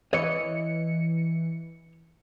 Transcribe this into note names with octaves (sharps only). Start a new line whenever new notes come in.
E3 C#5 D#5 C#7